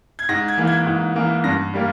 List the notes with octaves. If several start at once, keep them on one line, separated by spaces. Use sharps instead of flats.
G#6
G#2 A#6
G#6
E3 A#3
G#6
G#2
E3 A#3
G2 A#6
G3 A#3